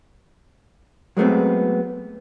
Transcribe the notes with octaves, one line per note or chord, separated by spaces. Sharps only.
F#3 G#3 A3 B3 C4